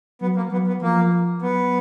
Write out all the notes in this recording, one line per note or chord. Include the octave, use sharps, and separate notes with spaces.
F#3 B3
A#3
F#3 B3
B3
F3 A#3
F#3 B3